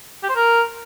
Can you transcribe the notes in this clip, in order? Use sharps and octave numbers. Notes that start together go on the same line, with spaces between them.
G4
C5
A#4